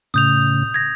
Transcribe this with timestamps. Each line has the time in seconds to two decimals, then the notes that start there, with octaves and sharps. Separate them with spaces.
0.14 A2 C#3 D#6 G6 F7
0.74 G#6 A#6